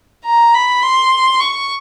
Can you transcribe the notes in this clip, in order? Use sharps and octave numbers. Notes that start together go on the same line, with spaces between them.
A#5
B5
C6
C#6